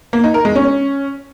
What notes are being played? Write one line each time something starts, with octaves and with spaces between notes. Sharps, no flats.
A#3
D#4
A#4
G#3
C#4